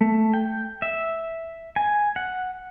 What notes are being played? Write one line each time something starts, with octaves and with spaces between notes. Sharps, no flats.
A3
G5
E5
G#5
F#5